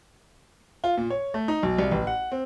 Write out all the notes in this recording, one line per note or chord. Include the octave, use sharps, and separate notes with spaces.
F4
A#2
C#5
A3
D#4
B1
C2
A1
F#5
C4